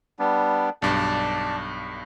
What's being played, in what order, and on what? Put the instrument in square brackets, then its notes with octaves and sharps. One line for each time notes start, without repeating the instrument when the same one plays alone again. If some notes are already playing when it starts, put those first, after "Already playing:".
[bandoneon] G3 B3 D4
[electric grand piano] B1 G2 [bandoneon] D5 A5